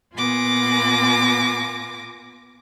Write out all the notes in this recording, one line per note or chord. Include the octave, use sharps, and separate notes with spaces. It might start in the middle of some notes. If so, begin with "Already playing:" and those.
A#2 B3 F4 G#5 D6 A#6